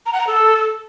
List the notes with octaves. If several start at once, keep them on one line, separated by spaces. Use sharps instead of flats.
A#5
F#5
A#5
A4